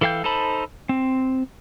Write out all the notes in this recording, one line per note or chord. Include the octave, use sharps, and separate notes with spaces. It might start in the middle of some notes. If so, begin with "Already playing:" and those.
E3 A4 F5 G5 G6
D#4 A4 C5 A5 B5
C4